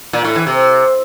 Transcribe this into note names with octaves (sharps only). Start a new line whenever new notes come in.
A#2
A2
E3
C3